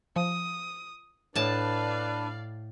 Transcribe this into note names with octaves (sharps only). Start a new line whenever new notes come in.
F3 D#6
A2 D4 B4 D5 F5 A5